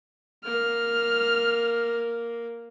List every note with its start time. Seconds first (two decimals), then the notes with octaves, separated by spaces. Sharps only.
0.45 A#3 F6